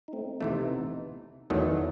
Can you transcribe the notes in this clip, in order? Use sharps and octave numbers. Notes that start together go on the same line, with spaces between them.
D#4
A3 C4
C3 E3 A3 B3 D#4
E2 D#3 F#3 A3 B3 D#4